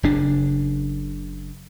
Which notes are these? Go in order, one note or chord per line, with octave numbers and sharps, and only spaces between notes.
F#1 C#3 D4